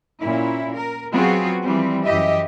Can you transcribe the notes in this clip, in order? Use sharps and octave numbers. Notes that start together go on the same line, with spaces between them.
A#2 C#4 E4
A#4
F#3 B3 C4 F4 F#4 G#4
E3 F3 G3 C4
F#2 E3 G4 D#5 E5